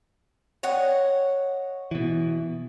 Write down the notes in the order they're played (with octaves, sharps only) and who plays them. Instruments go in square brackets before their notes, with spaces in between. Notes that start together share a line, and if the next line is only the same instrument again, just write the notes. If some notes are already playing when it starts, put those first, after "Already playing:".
[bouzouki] C#5 D#5 F#5
[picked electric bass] B2 E3